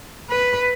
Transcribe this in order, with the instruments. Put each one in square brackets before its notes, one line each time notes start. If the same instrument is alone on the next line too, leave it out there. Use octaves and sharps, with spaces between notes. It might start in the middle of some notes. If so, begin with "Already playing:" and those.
[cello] B4